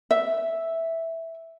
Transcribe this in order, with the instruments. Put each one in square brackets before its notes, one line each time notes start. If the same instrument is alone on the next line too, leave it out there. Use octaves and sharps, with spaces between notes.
[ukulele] E5